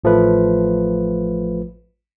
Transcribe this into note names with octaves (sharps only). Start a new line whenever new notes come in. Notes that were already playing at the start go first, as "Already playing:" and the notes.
A1 F3 A3 B4